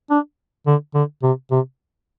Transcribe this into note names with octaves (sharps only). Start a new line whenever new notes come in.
D4
D3
D3
C3
C3